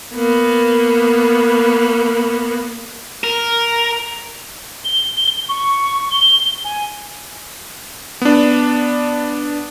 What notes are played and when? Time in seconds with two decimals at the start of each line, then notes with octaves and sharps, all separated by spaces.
0.14 A#3 B3
3.24 A#4
4.85 G7
5.49 C#6
6.11 G7
6.64 G#5
8.22 B3 D4